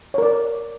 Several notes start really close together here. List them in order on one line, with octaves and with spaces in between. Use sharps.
C#5 A#4 D5